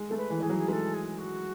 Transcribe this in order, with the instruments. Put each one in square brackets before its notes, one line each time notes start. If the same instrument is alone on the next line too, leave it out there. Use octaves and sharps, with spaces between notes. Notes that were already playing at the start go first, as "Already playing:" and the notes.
Already playing: [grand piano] G#3
[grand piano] A3 [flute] A4
[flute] B4
[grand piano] E3
[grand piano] E3 [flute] G#4
[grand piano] F#3
[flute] G#4
[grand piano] G#3 [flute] B4
[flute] A4
G#4
F#4